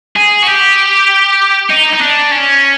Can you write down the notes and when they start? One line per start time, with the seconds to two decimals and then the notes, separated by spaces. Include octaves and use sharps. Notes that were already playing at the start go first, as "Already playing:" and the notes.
0.16 G#4
0.42 F#4
0.47 G4
1.70 D#4
1.93 D#4
2.01 D4
2.31 C#4